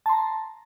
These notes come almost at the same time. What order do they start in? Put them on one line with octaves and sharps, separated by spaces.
A5 C6 A#5